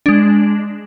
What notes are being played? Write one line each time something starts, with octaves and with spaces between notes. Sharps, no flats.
G#3 D4